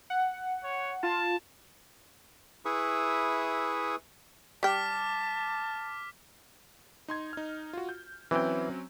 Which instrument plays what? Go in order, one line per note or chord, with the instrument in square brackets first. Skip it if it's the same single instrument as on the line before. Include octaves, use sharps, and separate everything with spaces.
[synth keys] F#5
[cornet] C#5
[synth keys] F4 [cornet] A5
[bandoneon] E4 G#4 B4 E5 C#6 D#6
[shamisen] G3 G5 [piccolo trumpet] A5 [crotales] D6 F6 B6
[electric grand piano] D#4 C6 G#6
D#4 F6
F4 F#4
G6
[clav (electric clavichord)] E3 G5 [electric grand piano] F#3 C4 C#4